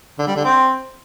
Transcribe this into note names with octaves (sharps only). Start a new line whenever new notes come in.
D3
G3
D3
C4